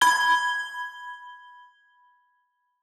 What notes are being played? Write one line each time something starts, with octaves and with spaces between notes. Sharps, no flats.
B5 G#6 G7